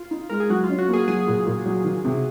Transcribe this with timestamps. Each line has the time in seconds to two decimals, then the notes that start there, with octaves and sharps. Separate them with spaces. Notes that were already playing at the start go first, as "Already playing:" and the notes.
Already playing: F4
0.11 D#4
0.30 G#3 A#4
0.40 G#4
0.50 F#3 F#4
0.64 F4
0.69 C#4
0.79 F#4
0.88 A#3
0.94 G#4
1.08 F#3 G#4
1.27 A#2
1.46 A#2
1.66 F#3
1.84 D#3
2.05 C3